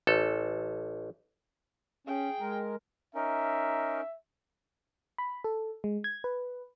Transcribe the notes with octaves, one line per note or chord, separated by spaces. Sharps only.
A1 A4
C#4 G#4 G5
G#3 A#4
C#4 D#4 A#4 E5
B5
A4
G#3
G#6
B4